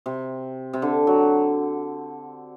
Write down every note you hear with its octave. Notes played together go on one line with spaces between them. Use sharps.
C3
C3
D3
F#3